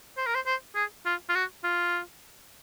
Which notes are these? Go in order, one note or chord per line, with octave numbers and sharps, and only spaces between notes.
C5
A#4
C5
C5
G#4
F4
F4
F#4
F4